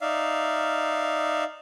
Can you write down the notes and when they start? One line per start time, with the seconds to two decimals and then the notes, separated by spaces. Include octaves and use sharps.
0.01 D#4 D5 E5 F5